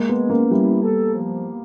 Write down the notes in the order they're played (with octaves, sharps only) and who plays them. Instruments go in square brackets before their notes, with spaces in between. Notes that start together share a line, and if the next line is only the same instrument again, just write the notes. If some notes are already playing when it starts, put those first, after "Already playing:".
Already playing: [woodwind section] G#3 [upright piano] A#3
[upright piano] B3
[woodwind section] C#4
[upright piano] A#3
[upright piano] G3 [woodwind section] E4
[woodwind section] A4
F3
A#3